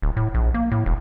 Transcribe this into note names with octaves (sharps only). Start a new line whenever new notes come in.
D1
A2
A#1
A#3
A2
E1